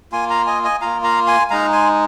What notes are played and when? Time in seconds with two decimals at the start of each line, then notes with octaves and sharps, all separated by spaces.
0.12 A#3 F4 G#5 C6
0.30 F5 A#5
0.46 D#5 G#5
0.64 D#5 G#5
0.81 A#3 F4 F5 A#5
1.04 F5 A#5
1.26 G#5 C6
1.50 G#3 D#4 F5 A#5
1.72 G#5 C6